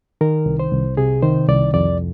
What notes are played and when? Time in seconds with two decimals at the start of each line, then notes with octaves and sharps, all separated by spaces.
0.21 D#3 A#4
0.46 C2
0.59 C5
0.72 C2
0.97 C3 G#4
1.22 D#3 C5
1.48 C2 D5
1.74 F2 D5